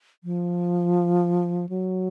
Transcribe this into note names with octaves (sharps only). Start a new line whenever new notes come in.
F3
F#3